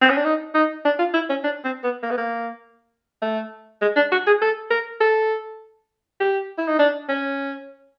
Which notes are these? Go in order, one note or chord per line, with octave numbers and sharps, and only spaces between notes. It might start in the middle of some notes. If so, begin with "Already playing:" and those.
C4
C#4
D4
D#4
D#4
D4
F4
E4
C#4
D4
C4
B3
A#3
B3
A#3
A3
G#3
D4
F#4
G#4
A4
A#4
A4
G4
E4
D#4
D4
C#4